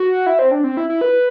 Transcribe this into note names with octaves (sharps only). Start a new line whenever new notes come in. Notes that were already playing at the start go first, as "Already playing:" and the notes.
Already playing: F#4
E4
C4
D4
C4
E4
E4
B4